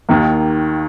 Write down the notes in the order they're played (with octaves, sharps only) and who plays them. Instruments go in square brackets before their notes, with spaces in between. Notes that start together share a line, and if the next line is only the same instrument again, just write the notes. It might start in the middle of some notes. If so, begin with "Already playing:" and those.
[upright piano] D#2 D#3 A#3